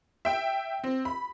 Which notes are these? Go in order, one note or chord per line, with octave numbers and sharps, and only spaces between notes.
E5 G5
C4
B5